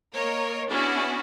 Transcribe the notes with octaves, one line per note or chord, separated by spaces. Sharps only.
A#3 A#4 C#5 D#5
B3 C#4 D4 E4 F#4 G#4